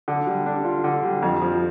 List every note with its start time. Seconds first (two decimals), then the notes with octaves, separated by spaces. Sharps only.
0.08 D3
0.27 G3
0.46 D4
0.65 F4
0.84 D3
1.03 G3
1.22 F2
1.41 F3